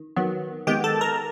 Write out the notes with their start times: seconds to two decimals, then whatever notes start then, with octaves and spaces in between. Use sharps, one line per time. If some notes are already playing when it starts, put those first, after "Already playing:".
Already playing: D#3
0.16 D#3 F#3 B3
0.67 D#3 G#3 B3 G4 G5
0.84 A4 A5
1.01 A#4 A#5